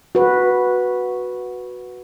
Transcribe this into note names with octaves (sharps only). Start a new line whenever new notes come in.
F#4 B4